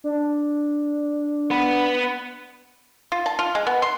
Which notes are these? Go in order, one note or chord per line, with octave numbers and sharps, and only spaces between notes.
D4
B3 B4
F4
A5
F4
G#3
B3
C6